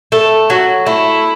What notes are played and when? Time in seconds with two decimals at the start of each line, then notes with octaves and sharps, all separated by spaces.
0.12 A3 A4
0.50 F#3 F#4
0.86 A3 E4